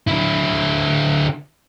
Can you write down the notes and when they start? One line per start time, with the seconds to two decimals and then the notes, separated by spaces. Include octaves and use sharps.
0.07 D3 E4